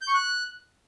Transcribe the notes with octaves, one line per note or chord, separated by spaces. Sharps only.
G6
C#6
F#6